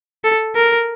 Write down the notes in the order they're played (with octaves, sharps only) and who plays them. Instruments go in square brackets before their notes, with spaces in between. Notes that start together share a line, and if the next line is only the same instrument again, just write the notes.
[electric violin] A4
A#4